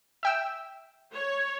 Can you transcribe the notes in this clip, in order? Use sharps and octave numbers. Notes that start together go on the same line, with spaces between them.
E5 G5 E6
C#5